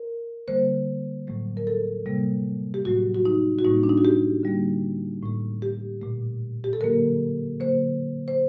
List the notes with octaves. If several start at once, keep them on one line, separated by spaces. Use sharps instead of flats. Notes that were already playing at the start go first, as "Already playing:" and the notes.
Already playing: A#4
D3 G3 A#3 C5
A2 F#3 A3
A#4
A4
C3 G3 A#3
G4
A2 F#3 A3 F#4
F#4
D#4
F#4
A2 G3 A#3 D#4
D4
D#4
F#4
G4
D3 G3 A#3
A2 A3
G4
A#2 A3
G4
A4
D3 F#3 A#3 A#4
D3 F#3 A#3 C5
C5